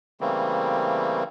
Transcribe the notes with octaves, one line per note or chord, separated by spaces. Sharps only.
C#3 E3 G3 A3 A#3 C4